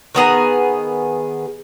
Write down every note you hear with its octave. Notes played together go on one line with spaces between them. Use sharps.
D#3 B3 G#4 A#5